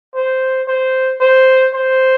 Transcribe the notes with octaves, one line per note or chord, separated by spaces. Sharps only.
C5
C5
C5
C5